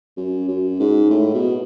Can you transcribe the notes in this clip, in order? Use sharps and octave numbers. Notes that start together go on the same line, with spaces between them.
F#2
F#2
G#2
A2
B2